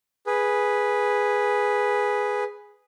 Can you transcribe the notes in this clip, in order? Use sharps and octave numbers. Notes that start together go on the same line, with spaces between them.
G#4 B4